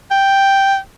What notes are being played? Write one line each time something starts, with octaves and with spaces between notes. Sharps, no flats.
G5